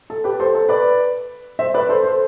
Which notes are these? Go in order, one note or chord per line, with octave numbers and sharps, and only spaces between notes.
A4
G4 B4
A4 C5
A4 C5
B4 D5
C5 E5
B4 D5
A4 C5
A4 C5